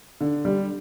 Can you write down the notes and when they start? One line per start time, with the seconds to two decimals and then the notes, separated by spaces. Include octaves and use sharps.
0.21 D3
0.45 G3